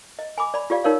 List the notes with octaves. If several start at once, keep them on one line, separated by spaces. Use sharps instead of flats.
D#5
G#5 B5 D6
D5 B5
F4 G4 D5 F5
D#4 G4 A#4 C#5 D5 F5